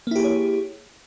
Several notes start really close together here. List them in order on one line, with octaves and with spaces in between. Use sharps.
A#3 E4 G4 G#4 C#5